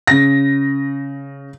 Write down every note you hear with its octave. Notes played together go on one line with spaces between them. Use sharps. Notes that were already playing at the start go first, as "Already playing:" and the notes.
C#3 A#6